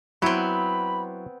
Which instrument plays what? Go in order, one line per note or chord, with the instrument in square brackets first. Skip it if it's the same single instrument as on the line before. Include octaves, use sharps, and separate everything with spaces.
[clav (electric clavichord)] F#3 E4 [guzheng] B3 C4 [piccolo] B5